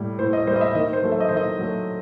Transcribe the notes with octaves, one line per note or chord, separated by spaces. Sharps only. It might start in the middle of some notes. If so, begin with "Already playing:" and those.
Already playing: A2 G3
A2 C5
D#5
G3 C5
D#5
E5
D#3 D#5
C5
F#3 A3
E5
D#5
D#3 C5
D#5
F#3 A3